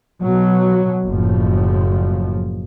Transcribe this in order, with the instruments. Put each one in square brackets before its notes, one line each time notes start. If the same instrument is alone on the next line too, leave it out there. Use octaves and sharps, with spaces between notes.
[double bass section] B2 F#3
F#1 A2 F3